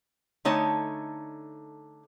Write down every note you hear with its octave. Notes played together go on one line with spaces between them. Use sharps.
D3 A3 D#4 C#5 A5